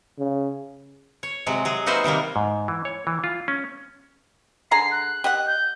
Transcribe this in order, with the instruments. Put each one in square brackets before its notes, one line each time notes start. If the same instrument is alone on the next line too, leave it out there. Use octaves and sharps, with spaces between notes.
[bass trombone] C#3
[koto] C#5
C3 F#3 G#3
F#3 G#4
A#3 D#4 F#4 B4 C5 E5
C3 D#3 G3 A#3
[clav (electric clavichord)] G#2
E3
C#5
E3
F4
C#4
[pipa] D3 G#4 A#5 [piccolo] C7
[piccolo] F#6
[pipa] G4 D#5 F#5
[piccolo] G6